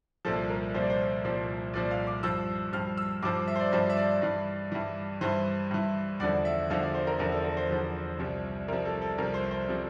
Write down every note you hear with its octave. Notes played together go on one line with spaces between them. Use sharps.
C2 A#2 F3 A4
A#4
C2 A#2 F3 C5
D5
C5
C2 A#2 F3
C2 A#2 F3 D5
F5
D6
G2 F3 E6
G2 F3 F6
E6
G2 F3 D6
D6
E5
C5
D5
G2 F3 E5
E5
D5
G2 E3
G2 E3
G2 E3 C5
G2 E3
E2 D3 F3 D5
E5
E2 D3 F3 F5
D5
C5
A#4
E2 D3 F3 A#4
A4
A#4
C5
E2 D3 F3
C2 C3 F3
C2 C3 F3 A#4
A4
A4
C2 C3 F3 A#4
C5
C5
C3 F3